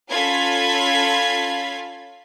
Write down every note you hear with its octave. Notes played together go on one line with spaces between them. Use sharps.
C#4 F4 A4 B5 G#6 B6